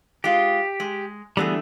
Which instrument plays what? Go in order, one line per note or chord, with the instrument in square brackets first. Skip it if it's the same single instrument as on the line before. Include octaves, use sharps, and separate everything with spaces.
[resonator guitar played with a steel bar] G#3 F4 [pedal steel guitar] G4
[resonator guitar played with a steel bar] G#3
[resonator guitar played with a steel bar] D3 E3 A3 [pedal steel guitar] G3 B3 G#4